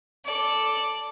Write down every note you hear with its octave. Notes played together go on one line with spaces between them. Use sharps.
A4 D5